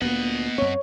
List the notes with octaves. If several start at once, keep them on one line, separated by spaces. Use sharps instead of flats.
D2 A#2 A#3 B3 D#5 F#5
F#2 C4 C#5